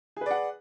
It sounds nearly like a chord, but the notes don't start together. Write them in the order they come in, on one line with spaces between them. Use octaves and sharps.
G#4 B4 D5 F#5